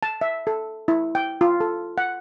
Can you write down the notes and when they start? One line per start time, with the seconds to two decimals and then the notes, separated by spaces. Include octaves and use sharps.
0.03 A5
0.21 E5
0.47 A4
0.88 E4
1.15 G5
1.41 F4
1.60 A4
1.98 F#5